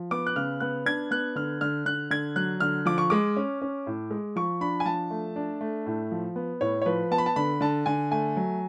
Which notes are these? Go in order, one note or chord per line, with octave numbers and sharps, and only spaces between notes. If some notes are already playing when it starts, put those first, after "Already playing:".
Already playing: F3
B3 D6
F#6
C#3 F6
B3 F#6
D4 G#6
B3 F#6
D3 F6
D3 F6
D3 F#6
D3 G#6
F#3 F#6
D3 F6
F3 D6
C#6
G#3 D6
C#4
C#4
A2
G#3
F3 C#6
D4 B5
G#5
F3 A5
A3
D4
A3
A2
F3
B3
A2 C#5
C#5
F3 B4
B3 A5
B5
A5
D3 B5
D3 A5
D3 G#5
A3 G#5
F#3